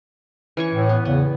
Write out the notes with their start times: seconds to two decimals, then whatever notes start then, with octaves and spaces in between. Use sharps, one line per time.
0.57 E3 C#4 C#6
0.74 A2
0.89 B3
1.05 E2 C#3 B3